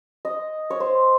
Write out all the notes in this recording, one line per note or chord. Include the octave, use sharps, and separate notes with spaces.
D#5
C#5
C5